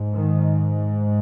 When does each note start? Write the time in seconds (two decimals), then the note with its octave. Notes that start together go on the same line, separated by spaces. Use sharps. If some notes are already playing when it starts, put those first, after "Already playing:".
Already playing: G#2
0.13 D#3